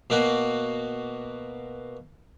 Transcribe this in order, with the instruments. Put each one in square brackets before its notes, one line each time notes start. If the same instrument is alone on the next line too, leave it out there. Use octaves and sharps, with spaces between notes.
[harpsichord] B2 A#3 F#4